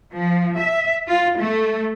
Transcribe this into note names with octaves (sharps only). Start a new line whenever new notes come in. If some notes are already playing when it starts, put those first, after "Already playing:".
F3
E5
F4
A3